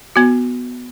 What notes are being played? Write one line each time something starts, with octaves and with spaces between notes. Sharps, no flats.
B3 F#4